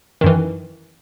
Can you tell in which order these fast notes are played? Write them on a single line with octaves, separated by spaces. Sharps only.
D#3 F#2 E3